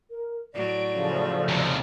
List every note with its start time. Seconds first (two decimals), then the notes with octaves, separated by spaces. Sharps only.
0.11 A#4
0.54 A2 F#3 D5 D7
0.93 C#3 F3 A3
1.49 D#2 C3